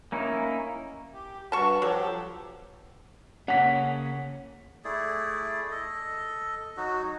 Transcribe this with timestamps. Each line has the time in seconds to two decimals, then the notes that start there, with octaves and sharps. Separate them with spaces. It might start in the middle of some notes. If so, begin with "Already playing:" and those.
0.12 A#3 C#4 D#4 E4
1.13 G4
1.52 G2 F#4 A5 C#6
1.82 F3 F#3 G4 A4
3.48 C#3 A#3 C#4 F#5 B6
4.85 A3 E4 G#4 D5
5.71 A4 D#5
6.77 F#3 D#4 F#4